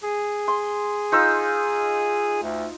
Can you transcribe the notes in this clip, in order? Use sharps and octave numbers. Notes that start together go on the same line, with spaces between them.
G#4
C6
D#4 F4 E6
D2